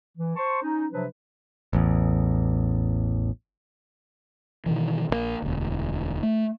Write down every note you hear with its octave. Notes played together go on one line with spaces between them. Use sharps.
E3
C5 A5 C6 C#6
C#4 D#4
C3 F3 F#3 D4 B4
A1 E2
B2 D#3 E3
A#1 C#3 A#3
E1 D2
A3